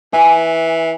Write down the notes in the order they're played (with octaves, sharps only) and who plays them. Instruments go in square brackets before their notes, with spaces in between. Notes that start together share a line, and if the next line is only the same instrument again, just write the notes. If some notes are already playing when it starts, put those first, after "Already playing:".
[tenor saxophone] E3 [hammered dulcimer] G#5